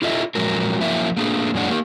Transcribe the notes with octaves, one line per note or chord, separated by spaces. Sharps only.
E4 F4 A4 D#5 E5
A#2 F3 F#3 G#3 A#4
F3 F#3 A#3 E4 A#4 E5
A3 A#3 D4 G#4
F#2 A#2 G#3 D4 F#5
A#3 G4 A#4